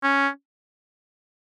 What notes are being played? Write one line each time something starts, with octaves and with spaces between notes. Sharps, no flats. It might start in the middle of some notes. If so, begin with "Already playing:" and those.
C#4